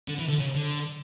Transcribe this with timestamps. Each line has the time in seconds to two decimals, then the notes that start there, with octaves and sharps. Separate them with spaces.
0.08 D3
0.19 E3
0.28 D3
0.39 C#3
0.55 D3